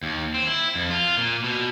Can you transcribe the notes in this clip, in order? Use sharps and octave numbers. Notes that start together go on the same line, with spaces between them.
D#2
C4
E4
F2
F4
A#2
B2